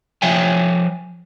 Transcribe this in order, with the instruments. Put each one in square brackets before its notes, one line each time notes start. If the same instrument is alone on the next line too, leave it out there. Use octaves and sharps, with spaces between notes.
[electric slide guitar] F3 C#5 E5 G5 G#5